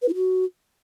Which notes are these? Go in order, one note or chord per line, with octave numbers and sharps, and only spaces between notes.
B4
E4
F#4